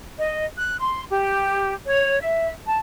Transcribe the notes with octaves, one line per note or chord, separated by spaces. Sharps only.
D#5
F#6
C6
G4
C#5
E5
A5